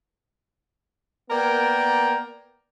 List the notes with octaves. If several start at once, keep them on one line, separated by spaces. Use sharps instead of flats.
A#3 B3 A#4 D5 G5